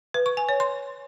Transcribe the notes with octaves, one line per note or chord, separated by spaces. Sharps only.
B4
C#6
G#5
C#5
C6